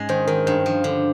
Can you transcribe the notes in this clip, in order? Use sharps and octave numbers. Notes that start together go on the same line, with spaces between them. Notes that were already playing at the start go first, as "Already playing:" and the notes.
Already playing: G#2 G#3 C#4
D#3 C5
D#3 A#4
G2 C5
F3
D3